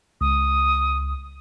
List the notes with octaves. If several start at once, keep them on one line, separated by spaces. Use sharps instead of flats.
C#2 D#6